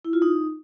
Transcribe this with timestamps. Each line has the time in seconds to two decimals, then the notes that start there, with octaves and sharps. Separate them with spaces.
0.05 E4
0.13 F4
0.22 D#4